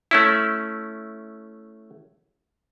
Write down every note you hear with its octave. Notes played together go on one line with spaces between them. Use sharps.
A3 C#4 E4